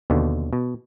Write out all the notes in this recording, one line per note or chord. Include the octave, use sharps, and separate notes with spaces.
D#2 B2 D3
B2